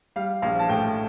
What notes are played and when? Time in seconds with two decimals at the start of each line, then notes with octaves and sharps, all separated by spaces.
0.16 G3 F5
0.42 A#1 F5
0.59 A5
0.69 A2 G5